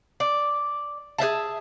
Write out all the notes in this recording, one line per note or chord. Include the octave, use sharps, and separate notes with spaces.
D5
G#4 C5 E5 A5